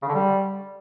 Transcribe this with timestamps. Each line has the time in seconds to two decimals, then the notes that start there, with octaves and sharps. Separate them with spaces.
0.02 C#3
0.08 D3
0.14 G3